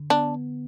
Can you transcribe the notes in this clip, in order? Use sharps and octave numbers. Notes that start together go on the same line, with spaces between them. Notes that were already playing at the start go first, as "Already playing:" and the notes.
Already playing: D3
B3 D4